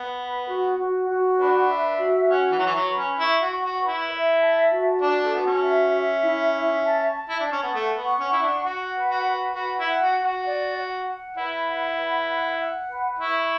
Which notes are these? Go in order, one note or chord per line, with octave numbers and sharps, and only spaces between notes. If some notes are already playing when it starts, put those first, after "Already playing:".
Already playing: B3
B4
F#4
F#4
F#4
D4 B4
E5
F#4
C#4 F#5
E3
F#3 C#6
E3
F#3
B4
C#4
E4 C#6
F#4
C#6
F#4
B4
E4
E5
A5
F#4
D4 A5
A3
B3 F#4
C#4
E5
E5
E4
E5
A5
A5
E4
D4 A5
C#4
B3
A3 F#5
B3
C#6
C#4
E4 F#5
D4
F#4 F#5
B4
F#4
B4
F#4 B4
E4
F#5
F#4
F#5
F#4
D5
F#5
F#5
E4 B4
F#5
B4
F#5
F#5
B4
E4 C#6